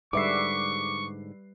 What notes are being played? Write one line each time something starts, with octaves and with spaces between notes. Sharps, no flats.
G#2 D3 G3 B4 E5 C#6 D6 C7